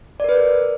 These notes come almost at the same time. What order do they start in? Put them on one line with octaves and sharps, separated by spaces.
D5 A#4 B4